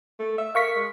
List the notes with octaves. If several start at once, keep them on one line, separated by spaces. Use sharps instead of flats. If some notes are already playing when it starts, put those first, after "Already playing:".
A3
E5
A#4 F5 C#6 B6
G#3